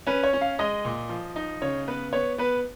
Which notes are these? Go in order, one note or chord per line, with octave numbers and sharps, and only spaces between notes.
C#4 B4
C#5
C#4
F5
G#3 D#5
A#2
F3
D#4
C#3 C#5
B3 B4
B3 C#5
B3 B4